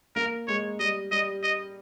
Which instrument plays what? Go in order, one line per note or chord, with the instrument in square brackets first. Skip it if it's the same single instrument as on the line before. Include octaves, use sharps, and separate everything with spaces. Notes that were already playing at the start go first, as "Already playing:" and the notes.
[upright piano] A#3 [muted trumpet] A#4
[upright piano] G#3 [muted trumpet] C#5
[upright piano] G3 [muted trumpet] D#5
[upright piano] G3 [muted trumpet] D#5
[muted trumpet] D#5